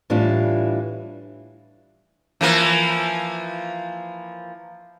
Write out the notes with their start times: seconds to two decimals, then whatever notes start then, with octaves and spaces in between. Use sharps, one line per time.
0.10 A2 E3 G3 D4 F4
2.41 E3 F3 A#3